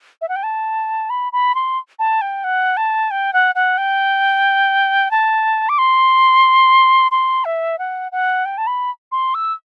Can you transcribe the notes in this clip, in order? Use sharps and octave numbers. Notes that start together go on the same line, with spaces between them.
E5
F#5
G5
A5
B5
B5
C6
A5
G5
F#5
A5
G5
F#5
F#5
G5
A5
D6
C6
C6
E5
F#5
F#5
G5
A5
B5
C6
E6